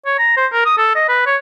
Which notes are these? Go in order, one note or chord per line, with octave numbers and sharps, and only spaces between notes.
C#5
A#5
C5
A#4
D#6
A4
D#5
B4
C#5